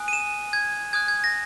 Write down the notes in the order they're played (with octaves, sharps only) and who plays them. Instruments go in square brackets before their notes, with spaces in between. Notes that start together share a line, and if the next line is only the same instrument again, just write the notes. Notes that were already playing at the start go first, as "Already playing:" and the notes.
Already playing: [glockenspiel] G#5 D#6 F#6
D#7
E7
G#6
G#5 D#6 F#6 G#6
G#6
A#6